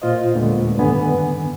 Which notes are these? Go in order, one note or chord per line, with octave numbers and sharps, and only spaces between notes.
A#2 F4 C5 D#5
D#2 A#2 D3 G#3 A3 B3
G2 D3 D#3 B3 G#5